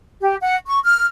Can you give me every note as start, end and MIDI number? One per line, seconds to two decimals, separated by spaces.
0.21 0.35 67
0.39 0.55 78
0.66 0.80 85
0.84 1.06 89